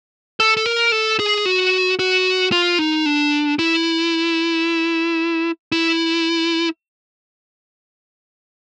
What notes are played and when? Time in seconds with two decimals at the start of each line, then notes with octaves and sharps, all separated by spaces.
0.40 A4
0.57 A4
0.66 A#4
0.92 A4
1.20 G#4
1.46 F#4
1.99 F#4
2.52 F4
2.79 D#4
3.06 D4
3.59 E4
5.72 E4